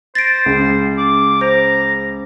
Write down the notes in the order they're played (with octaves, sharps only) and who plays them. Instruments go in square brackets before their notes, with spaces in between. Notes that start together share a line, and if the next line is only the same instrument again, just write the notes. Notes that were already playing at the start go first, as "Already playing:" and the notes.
[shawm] C5 [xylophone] A6 A#6 D7
[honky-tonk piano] C#2
[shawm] D6
[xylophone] C5 [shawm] A#5